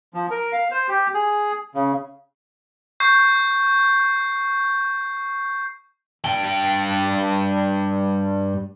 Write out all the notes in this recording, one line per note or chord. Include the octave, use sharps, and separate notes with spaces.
F3
A#4
F5
C5
G4
G#4
C#3
C#6 G6 C7
G2 G5